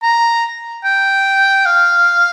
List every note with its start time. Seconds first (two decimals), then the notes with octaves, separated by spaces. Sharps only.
0.03 A#5
0.84 G5
1.66 F5